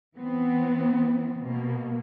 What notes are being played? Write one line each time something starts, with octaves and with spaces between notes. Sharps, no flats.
E3 B3 C4
B2 A#3